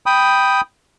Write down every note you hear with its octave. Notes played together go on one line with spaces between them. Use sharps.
G5 B5 D#6